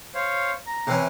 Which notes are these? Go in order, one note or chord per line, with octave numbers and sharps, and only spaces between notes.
C5 C#5 F5
A#5
C3 E3 C#4